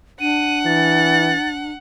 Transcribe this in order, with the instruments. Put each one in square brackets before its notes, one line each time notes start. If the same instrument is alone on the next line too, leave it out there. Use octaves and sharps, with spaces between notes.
[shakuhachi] D4 [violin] F#5 [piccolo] D#7
[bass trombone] E3 [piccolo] A6